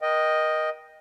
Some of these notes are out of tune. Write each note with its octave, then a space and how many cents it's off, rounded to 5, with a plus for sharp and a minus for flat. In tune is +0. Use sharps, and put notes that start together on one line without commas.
A#4 +30 D#5 +0 G5 +0